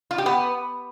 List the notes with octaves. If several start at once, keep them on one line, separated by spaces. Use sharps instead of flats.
F4
G4
B3